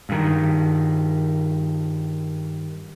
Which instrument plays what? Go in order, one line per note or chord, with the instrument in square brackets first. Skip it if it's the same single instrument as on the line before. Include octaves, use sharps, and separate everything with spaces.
[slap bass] G2 D#3